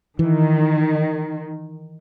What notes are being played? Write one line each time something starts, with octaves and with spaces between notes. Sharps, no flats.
D#3 E3